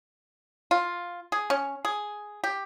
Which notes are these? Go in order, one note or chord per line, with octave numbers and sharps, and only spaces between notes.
F4
G#4
C#4
G#4
G4